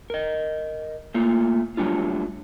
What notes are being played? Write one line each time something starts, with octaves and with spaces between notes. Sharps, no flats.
A#4 D#5
A3 A#3 F4
F#3 G3 A3 D4 F4